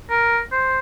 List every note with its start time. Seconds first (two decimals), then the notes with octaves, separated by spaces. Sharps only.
0.10 A#4
0.52 C5